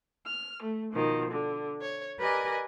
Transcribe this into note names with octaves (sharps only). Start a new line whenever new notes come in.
F6
A3
B2 D#3 F3
D3
C#5
G4 A#4 B4 D5 D#5 G#5